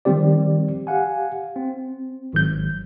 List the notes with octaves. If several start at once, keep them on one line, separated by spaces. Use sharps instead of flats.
D#3 F3 G3 C4 G4 D5
G4 F5 F#5 G#5
C4
G#1 F#3 G6